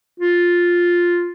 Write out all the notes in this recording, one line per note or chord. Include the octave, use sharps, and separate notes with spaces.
F4